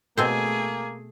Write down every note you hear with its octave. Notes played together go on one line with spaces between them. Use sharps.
B2 A3 A#3 C4 G#4 C5 G#5